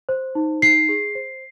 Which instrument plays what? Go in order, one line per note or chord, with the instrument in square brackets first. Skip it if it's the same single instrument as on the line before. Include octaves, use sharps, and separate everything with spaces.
[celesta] C5
D#4
D#4 C7
G#4
C5